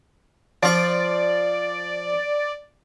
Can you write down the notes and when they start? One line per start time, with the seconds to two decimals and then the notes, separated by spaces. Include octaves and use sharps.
0.63 F3 F4 D5 D6